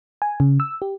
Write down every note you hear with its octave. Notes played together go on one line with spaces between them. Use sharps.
G#5
C#3
E6
G4